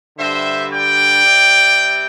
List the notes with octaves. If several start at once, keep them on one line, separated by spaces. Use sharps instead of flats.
G2 D3 G3 C5 E5
D5 G5
C3 G3